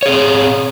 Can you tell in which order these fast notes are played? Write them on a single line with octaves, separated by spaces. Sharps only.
C#5 G#4 C4